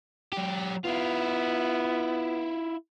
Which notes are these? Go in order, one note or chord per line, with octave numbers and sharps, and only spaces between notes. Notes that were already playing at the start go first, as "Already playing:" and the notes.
F#3 G4
B3 E4 F4